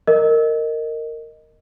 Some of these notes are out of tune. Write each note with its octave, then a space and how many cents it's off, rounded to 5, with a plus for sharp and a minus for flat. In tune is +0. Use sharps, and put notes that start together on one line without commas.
A#4 -20 D#5 -5